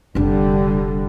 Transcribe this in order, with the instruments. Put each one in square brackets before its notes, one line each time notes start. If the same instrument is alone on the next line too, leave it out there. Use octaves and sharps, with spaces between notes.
[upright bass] F1 D4 [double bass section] D3 G3